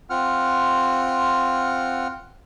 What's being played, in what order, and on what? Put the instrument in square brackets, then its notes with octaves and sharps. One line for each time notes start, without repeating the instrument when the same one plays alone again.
[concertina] C4 F4 F#5 F6